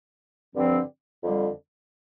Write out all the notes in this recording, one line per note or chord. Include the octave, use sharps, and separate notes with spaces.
G2 D3 F3 C4
F2 D3 G3